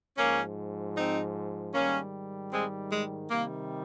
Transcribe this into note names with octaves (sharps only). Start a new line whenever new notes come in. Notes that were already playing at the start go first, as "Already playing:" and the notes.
G#2 F3 A#3 C#4
C4 D#4
G#2 D#3 G3 A#3 C#4
G#3 C4
G#3
C3 D#3 G3 A#3